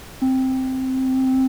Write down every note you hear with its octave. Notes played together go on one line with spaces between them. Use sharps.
C4